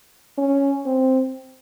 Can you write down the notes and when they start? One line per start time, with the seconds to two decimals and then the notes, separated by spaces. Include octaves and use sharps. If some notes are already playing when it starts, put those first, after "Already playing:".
0.38 C#4
0.86 C4